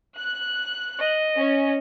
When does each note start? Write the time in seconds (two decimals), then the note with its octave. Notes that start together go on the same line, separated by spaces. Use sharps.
0.18 F#6
0.99 D#5
1.38 C#4